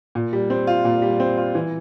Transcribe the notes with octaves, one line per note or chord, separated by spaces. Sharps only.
A#2
G3
C4
F4
A#2
G3
C4
F4
E3